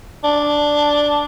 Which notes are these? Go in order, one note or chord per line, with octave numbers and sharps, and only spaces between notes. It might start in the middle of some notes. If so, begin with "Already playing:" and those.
D4